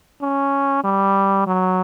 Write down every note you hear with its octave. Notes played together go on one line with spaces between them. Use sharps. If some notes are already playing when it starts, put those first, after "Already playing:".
C#4
G3
F#3